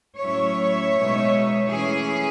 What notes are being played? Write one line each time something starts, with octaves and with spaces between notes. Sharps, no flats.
A2 F#3 C#4 E4 C#5 E5
B2 G#3 D#4
E3 A3 C#4 E4 G#4